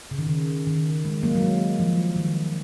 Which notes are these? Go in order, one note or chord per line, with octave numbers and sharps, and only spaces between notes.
C#3
D#3
C#3
D#3
G#3
F#3 A#3
F#3
G#3
F3
D#3